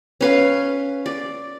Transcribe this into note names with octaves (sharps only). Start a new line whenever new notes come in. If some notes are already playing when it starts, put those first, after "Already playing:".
C#4 B4 F5
D5